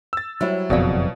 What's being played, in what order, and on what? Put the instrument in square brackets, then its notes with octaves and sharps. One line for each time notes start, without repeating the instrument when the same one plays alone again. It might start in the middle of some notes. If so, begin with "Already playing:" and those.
[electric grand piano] E6 A6
[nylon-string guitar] F#3 G3 E4 [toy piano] C5 E5
[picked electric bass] F#1 F2 [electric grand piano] B2 [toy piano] A#4 D5 F5